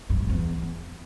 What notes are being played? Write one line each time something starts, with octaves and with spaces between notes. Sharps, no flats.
G2
A2
E2